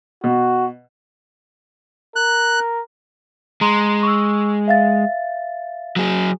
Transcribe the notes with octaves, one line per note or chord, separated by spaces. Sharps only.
B2 F#4
A#4 F#6
G#3 A#5 C6
C#6 E6
E5 F5 A6
F#3 G#4